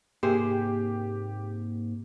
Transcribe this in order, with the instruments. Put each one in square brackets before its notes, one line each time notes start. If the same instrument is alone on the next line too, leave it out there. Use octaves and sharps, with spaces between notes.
[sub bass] G#2 [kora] C3 G#4 C5 [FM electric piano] A#3 [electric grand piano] G4